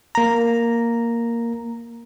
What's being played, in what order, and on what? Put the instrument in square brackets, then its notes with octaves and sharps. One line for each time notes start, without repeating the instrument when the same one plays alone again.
[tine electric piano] A#3 A#5